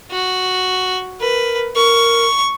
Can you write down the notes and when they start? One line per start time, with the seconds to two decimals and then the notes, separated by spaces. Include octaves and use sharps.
0.11 F#4
1.21 A#4 B4
1.76 A#4 C#6